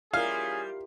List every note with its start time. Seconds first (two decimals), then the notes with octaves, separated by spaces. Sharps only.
0.14 G3 C#4 E4 F4 G#4 A#4 F5